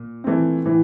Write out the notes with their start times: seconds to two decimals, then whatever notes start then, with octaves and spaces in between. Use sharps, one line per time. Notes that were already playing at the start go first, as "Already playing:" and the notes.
Already playing: A#2
0.24 E3 A3 C4
0.65 A2 E3